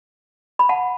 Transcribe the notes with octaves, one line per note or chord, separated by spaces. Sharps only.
B5
F#5 A5